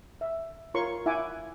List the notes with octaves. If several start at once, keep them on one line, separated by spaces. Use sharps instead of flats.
E5
F4 A#4 C#5 C6 C#6
E4 E5 F#5 G#5 D6